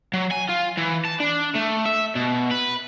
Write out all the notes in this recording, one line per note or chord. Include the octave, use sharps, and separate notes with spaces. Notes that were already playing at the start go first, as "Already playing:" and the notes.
F#3
G#5
F4
E3
A5
D4
A3
E5
B2
B4